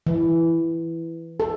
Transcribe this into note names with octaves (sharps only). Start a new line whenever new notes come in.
E3
A4